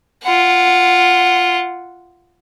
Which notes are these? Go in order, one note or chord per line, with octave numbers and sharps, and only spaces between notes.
F4 F#5